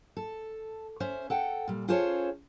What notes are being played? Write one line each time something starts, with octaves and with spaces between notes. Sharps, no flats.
A4
C#4 C5 E5
A4 F#5 G5
A#2 G3
C#4 F4 G#4 A4 C5 C#5